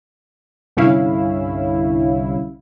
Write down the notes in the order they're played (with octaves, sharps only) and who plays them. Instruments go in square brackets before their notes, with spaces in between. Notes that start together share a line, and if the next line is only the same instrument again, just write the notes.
[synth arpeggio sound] C2 G2 D3 C#4 E4 F5